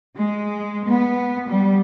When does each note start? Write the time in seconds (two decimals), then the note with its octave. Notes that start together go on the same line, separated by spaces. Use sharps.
0.16 G#3
0.86 B3
1.47 G3